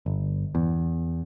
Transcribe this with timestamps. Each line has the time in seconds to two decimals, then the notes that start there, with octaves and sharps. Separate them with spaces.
0.06 G1
0.55 E2